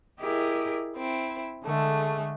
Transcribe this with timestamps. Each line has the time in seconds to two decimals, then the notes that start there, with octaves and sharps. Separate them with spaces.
0.20 E4 G4 G#4 A#4 D#5
0.96 C4 E4
1.64 D3 G#3 A3 G#4